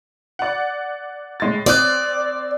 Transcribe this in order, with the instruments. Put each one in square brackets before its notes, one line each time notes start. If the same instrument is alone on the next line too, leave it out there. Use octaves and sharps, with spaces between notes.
[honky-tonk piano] D5 F#5
A2 G#3 A6
[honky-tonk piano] C4 D#6 F#6 [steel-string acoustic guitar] D5